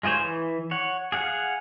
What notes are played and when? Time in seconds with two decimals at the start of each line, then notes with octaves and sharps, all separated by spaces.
0.03 G#3 F4 G#4 C5 C#5
0.19 E3
0.71 C#5 F#5
1.12 G#4 F5 F#5